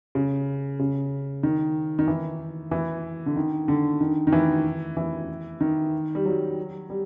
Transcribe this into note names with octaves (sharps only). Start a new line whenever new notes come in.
C#3
C#3
D#3
D#3
E3
E3
D3
D#3
D3
D#3
D#3
E3
E3
D#3
G3
F#3
G3